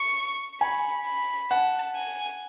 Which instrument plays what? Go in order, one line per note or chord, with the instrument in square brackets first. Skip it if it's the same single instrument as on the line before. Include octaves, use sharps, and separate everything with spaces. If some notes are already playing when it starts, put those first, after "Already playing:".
Already playing: [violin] C#6
[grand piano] G#5 [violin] B5
[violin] B5
[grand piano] F#5 [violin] A5
[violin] G#5